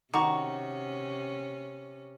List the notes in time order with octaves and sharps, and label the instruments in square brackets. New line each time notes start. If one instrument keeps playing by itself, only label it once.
[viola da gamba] C3 C#4 [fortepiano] D#3 C#6 [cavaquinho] F#4 [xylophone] A#5 D6